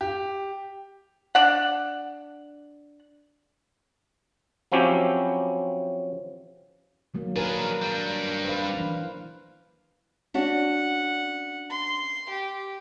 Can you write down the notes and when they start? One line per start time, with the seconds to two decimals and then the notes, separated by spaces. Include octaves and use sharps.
0.01 G4
1.35 D4 F#5
4.72 F3 F#3 C4 C#4 E4 G4
7.14 D#3 F#3 A#3
7.36 D4 G#4 A#4 B4
7.82 G3 D4
8.45 B4 C5 F5
8.73 E3 D4
10.34 C#4 D4 F#4 F#5
11.70 C6
12.29 G4